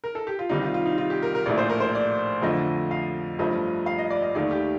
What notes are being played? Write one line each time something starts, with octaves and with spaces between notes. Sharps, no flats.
A#4
A4
G4
F4
C2 C3 D#3 G3 D#4
F4
F4
D#4
F4
G4
A#4
A#4
A#1 A2 A3 D5
C5
A#4
C5
D5
F2 D3 F3 A3 D#5
F5
G1 G2 F3 A3 D#5
F5
D#5
D5
D#5
D#2 D#3 A3 D5
G4